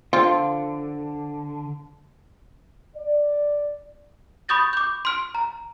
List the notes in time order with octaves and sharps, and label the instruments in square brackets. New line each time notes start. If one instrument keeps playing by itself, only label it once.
[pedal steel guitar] D3 [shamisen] F3 C4 F4
[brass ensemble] D5
[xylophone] B5 C#6 D#6 G6 A6 A#6
D6 G6
C6 F6 D7
A#5